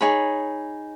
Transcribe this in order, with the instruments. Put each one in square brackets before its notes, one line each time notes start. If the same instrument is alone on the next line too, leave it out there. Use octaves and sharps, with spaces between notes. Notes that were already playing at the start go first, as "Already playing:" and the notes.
[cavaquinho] D#4 G#4 C#5 B5